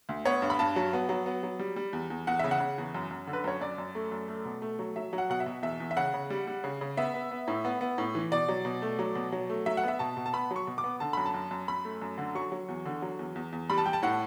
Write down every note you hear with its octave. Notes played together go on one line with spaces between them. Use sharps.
D2
B3 C#5
G2
B5
G2 A5
F#3
B3
F#3
B3
F#3
G3
G3
E2
E2
E2 F#5
C#3 E5
F#5
C#3
E2
F#2
F#2
D3
B4
F#2 C#5
F#2 D5
F#2
A3
F#2
A3
B2
A3
F#3
F#3 E5
F#3
F#5
B2 F#5
E5
B2
E2 E5
E2
E5
C#3 F#5
C#3
G3
G3
C#3
C#3
B3 E5
B3
B3
A2
B3
B3
A2
E3
B2 D5
F#3
B2
A3
F#3
B2
F#3
A3
F#3 E5
F#5
B3 E5
B2 A5
B2
A5
B3 B5
F#3
C#6
B2
D6
B3
D3 A5
F#2 B5
A5
F#2
F#2
F#2 B5
A3
F#2
D3
F#3 C#6
F#3
E2
D3
F#3
E2
E2
E2
G3 B5
A5
G3 G5
A5
A2 F#5